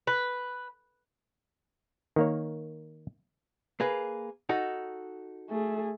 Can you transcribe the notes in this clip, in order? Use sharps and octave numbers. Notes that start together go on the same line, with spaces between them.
B4
D#3 A#3 C#5
A#3 G#4 B4
D#4 F#4 A4
A3 G#4